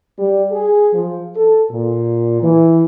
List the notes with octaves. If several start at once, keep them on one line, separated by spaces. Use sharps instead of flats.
G3
G#4
F3
A4
A#2
E3